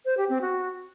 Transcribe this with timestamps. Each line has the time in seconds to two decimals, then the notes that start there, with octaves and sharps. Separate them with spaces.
0.05 C5
0.17 G4
0.29 C4
0.41 F#4